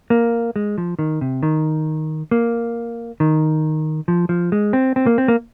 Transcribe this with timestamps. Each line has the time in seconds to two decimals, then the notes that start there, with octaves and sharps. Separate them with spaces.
0.10 A#3
0.56 G#3
0.78 F3
0.99 D#3
1.21 C3
1.43 D#3
2.31 A#3
3.20 D#3
4.08 F3
4.29 F3
4.52 G#3
4.73 C4
4.96 C4
5.06 A#3
5.18 C4
5.28 A#3